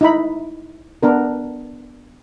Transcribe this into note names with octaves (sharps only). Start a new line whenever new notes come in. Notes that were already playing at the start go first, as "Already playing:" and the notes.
D#4 E4 B5
B3 D4 A#4